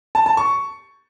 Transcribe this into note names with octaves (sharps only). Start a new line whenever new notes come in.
A5
A5
C#6